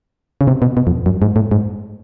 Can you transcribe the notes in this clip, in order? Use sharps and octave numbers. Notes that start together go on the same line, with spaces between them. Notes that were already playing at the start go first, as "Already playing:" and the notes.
C#3
C3
B2
B2
F2
F#2
G#2
A2
G#2